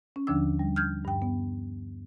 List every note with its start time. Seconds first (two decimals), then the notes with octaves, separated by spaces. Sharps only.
0.16 C#4
0.27 D#2 D3 F3 D4 E6
0.59 G3
0.76 F6 G6 G#6
1.05 G2 G5
1.22 B3